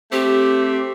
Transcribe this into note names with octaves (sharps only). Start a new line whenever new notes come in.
A3 C4 G4